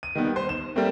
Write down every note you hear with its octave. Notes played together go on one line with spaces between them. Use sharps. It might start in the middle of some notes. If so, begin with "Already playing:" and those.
D#7
D#3 G3 B3
C5
E7
G3 A3 A#3 C4